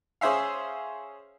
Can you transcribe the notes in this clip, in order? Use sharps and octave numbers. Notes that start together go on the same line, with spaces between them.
C#4 G#4 C5 E5 F5